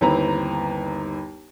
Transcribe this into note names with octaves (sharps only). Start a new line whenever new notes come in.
G1 D#2 C4 E4 B4 A#5